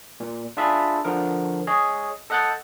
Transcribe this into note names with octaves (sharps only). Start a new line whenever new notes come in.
A#2
D4 F4 G#4 E5 A5 B5
D3 F3 A#4
G#4 C#5 D#5
A4 D#5 F#5 F#6 G6 A6